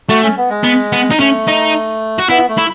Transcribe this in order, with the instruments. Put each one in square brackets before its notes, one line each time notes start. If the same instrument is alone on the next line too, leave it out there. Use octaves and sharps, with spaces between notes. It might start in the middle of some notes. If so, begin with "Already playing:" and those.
[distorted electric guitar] A3 [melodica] F#4
[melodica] C#4
B3
G#3
[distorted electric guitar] B3
B3
D#4
[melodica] A3 [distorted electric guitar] C#4
[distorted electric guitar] D#4
F#4
[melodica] B3 [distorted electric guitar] E4
[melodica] A3
[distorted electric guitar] E4